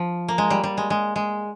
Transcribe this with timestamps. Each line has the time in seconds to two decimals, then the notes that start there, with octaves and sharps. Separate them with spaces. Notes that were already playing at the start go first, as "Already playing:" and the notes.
Already playing: F3
0.28 A#3
0.38 G#3
0.50 G3
0.64 G3
0.77 G#3
0.90 G#3
1.16 G#3